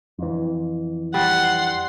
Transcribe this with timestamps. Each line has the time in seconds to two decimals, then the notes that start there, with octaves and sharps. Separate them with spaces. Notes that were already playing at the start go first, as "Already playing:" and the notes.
0.19 F2 E3
1.14 G3 F#5 C6